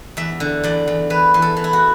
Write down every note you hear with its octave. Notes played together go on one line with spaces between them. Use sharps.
E2 E5
D3
E2 D5
E2
E3 B4
E3
A4
E3
E4
F#4